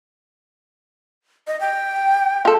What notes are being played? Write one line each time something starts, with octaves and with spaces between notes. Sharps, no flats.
D#5
G5
F4 A4